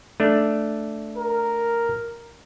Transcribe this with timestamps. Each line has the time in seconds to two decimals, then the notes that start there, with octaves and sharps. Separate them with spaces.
0.20 A3 D4
1.17 A#4